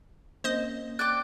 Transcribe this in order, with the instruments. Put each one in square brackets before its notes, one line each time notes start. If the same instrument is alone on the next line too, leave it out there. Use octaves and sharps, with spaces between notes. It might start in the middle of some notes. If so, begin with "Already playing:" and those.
[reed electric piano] A#3 C4 C#4 [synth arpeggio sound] C5 D#5
[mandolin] D5 G5 D6 [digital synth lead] F#6